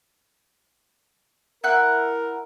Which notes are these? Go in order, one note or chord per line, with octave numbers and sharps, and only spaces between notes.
E4 A#4 F#5 F#6